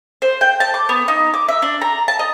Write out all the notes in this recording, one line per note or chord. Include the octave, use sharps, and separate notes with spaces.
C5
G5
A5
D6
B3
D#4
D6
E5
D4
A#5
A5
D#5